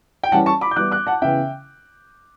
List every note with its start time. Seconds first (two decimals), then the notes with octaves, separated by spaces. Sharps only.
0.23 G5
0.32 E3 G3 C#4 F#5 A5
0.46 A5 C#6
0.61 B5 D6
0.71 G6
0.76 E3 G3 B3 E4 D6 F#6
0.92 D6 F#6
1.07 F#5 A5
1.22 C#3 E3 B3 E5 G5